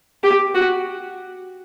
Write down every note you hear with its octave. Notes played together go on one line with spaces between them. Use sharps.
G4
F#4